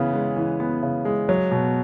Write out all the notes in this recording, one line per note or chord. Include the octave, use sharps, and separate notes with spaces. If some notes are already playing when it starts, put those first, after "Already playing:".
Already playing: C#3 E3 B3
G#3
E3
B3
C#3
G#3
F#3
B2